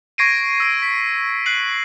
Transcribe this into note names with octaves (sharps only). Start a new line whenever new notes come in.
C#6 G#6 A#6 C7 D7 D#7
E6 A#6 D7
B6
F#6 C7 F#7